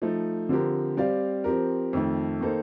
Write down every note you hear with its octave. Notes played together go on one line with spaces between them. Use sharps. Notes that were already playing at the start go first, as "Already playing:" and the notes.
F3 A3 D#4
D3 F3 C4 G4 A#4
G3 C4 G4 D5 F5
F3 C4 G4 A#4
F2 D#3 A3
D#3 A#3 D#4 A4 C5